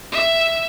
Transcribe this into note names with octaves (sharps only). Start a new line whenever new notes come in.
E5